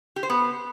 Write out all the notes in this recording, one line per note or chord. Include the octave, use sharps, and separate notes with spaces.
G4
C5
B3